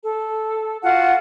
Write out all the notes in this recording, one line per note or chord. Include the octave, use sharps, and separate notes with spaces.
A4
F4 F#4 F#5